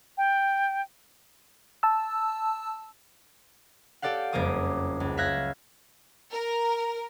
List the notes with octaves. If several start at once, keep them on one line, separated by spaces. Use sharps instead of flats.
G5
A5 E6
G4 A4 D5 F5 F#5
F#1 F2 G3 A#3 D6 D#6
C#2
E5 F5 F6 F#6 G#6 A#6
A#4